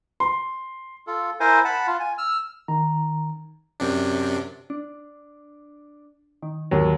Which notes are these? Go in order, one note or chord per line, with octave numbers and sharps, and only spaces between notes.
C6
F4 A4
E4 A#4 C5 G#5
F#5 A5 B5
F4
G#5
E6 F6
D#3 A#5
F#2 C3 D4
D4
D#3
D#2 G#2 F#3